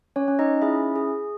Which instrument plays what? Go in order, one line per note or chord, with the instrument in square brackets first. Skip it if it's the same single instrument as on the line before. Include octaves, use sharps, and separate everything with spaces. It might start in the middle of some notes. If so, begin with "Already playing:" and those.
[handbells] C#4 C#5
C#4
D#4 D#5
E4 G#4 E5
G#4